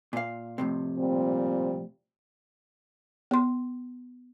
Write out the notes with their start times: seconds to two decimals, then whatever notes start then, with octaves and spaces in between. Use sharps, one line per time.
0.13 A#2 F5
0.58 F2 A2 C3
0.98 A#2 G3 C4
3.31 B3 C6